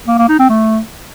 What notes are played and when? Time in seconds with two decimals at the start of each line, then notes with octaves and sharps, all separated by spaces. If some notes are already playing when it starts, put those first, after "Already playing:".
0.08 A#3
0.18 A#3
0.29 D#4
0.39 C4
0.50 A3